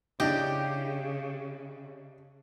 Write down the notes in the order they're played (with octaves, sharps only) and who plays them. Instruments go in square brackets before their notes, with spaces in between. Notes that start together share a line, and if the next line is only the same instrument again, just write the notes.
[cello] C#3 [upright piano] D4 E4 D#5 [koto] G4